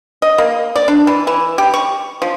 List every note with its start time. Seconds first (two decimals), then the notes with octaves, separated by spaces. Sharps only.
0.22 D#5
0.38 A#3
0.75 D5
0.88 D4
1.07 E3
1.27 E3
1.58 G4
1.74 C#6
2.22 F3